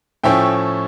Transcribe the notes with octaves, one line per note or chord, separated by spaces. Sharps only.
A2 F3 A3 C#4 E4 E5 G5